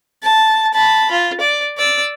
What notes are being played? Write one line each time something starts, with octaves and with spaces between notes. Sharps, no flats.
A5
A5 B5
F4
D5
D5 E6